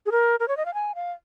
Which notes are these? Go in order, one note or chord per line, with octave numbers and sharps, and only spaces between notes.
G#4
A#4
A#4
C#5
D#5
F5
G#5
F5